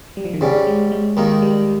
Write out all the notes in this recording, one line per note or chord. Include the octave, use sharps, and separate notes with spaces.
G3
F3
D#3
G#2 C#3 G3 C#4
G#3
G#3
D#2 D#3 G#3 A#3 D#4
G3